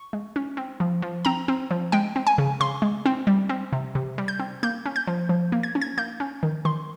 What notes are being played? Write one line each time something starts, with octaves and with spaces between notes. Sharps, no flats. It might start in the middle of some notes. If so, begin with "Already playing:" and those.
Already playing: C#6
G#3
C#4
C4
F3
F3
C4 A#5
C4
F3
G#3 G5
C4
G#5
C#3
C#3 C6
G#3
C4
G3
C4
C3
C3
G3
G6
C4
A#3 G6
C#4
G6
F3
F3
A#3
G#6
C#4
G#6
A#3 G6
C#4
D#3
D#3 C6